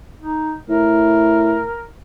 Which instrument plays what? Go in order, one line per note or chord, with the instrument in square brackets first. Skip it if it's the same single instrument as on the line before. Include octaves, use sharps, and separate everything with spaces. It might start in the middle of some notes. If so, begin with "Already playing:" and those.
[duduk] D#4
[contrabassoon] A2 [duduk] A#4